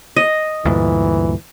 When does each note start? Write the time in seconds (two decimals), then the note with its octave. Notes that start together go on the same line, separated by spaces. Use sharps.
0.16 D#5
0.65 D2 G2 A#2 E3